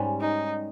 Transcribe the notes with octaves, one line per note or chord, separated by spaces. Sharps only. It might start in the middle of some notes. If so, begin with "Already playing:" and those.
Already playing: G#2 G3 C#4
D#4